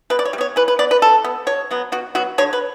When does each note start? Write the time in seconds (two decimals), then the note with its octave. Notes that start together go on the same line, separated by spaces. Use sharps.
0.10 B2 B4
0.19 D5
0.25 C#5
0.33 G3
0.38 B3 C#5
0.56 E3 B4
0.68 B4
0.79 B3 D5
0.91 B4
1.02 E3 A4
1.24 B3
1.47 B2 C#5
1.71 F#3 B3
1.92 B2 F#4
2.15 F#3 B3 F#4
2.38 D3 C#5
2.53 B4